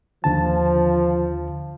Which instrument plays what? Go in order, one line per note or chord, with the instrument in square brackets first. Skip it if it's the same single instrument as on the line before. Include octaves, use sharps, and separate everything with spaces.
[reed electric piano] D#2 D3 A5 [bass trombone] F3